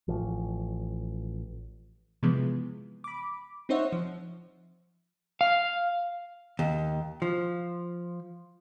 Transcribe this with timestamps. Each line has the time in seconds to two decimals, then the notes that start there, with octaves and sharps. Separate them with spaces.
0.08 A1 F3
2.23 C3 E3 F3 G#3 B3
3.04 B5 D6
3.69 C4 D#4 C5 C#5 E5 F#5
3.92 F3
5.41 F5
6.59 D#2
7.22 F3